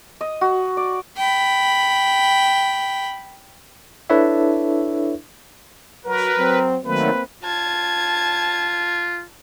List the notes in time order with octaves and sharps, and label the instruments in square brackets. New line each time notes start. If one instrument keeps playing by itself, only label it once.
[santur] D#5
F#4
D5
[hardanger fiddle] G5 B5
[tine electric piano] D4 E4 A4 B4 C#5 E5
[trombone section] F#3 F#4 [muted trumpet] A#4 [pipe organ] B4
[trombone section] F#3 C4
[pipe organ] D#3 F#3 A3 [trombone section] A#3 C4 [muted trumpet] B4
[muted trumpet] F4 [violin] A5 G#6